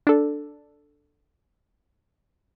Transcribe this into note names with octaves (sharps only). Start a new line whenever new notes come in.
D4 A4